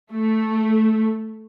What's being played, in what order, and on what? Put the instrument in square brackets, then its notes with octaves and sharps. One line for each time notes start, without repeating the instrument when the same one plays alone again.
[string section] A3